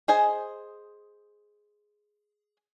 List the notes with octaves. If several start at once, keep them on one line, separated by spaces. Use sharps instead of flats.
G#4 C5 D#5 G#5